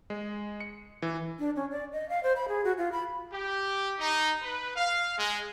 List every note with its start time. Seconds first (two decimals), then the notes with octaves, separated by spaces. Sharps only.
0.10 G#3
0.60 C#7
1.02 E3
1.39 D4
1.56 C#4
1.71 D5
1.92 D#5
2.09 F5
2.23 C5
2.36 B5
2.48 G#4
2.64 F#4
2.78 F4
2.92 B5
3.32 G4
3.99 D#4
4.42 B4
4.76 F5
5.18 G#3